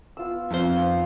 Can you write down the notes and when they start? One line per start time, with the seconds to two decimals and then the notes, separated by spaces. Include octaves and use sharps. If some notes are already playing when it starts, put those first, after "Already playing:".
0.17 B3 F4 E6
0.51 F2 D#4 F4 C5 F5